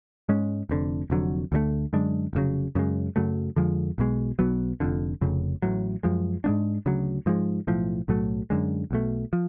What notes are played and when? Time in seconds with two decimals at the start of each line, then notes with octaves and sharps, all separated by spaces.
0.29 G#2 G#3 C#4
0.69 F1 F2 D3
1.10 F1 F2 D3 F#3
1.52 D2 D3 F#3 A3
1.93 F#2 D3 G#3 D4
2.33 F1 F2 C#3 F#3
2.75 F#2 C#3 G#3
3.16 F#2 C#3 F#3 A3
3.56 F2 D3 F3 G#3
3.98 B1 B2 G#3
4.39 B1 B2 F#3 B3
4.80 F1 F2 D3
5.21 F1 F2 C#3
5.62 A1 A2 F#3
6.03 F#2 F3 G#3
6.44 G#2 G#3 B3 D4
6.86 D2 C#3 F#3
7.26 G#2 F3 G#3
7.67 B1 A2 F3
8.08 B1 A2 F#3 A3
8.50 F#2 D3 G#3
8.91 B1 B2 A3
9.33 F3